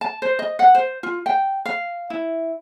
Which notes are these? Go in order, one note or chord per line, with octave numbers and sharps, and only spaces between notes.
A5
C5
D#5
F#5
C5
F4
G5
F5
E4